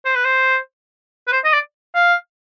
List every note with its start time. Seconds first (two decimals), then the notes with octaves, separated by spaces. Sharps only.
0.05 C5
0.16 B4
0.25 C5
1.27 B4
1.32 C5
1.45 D#5
1.53 D5
1.95 F5